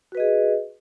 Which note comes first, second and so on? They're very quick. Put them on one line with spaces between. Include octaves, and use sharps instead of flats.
F#4 B4 D#5 G#4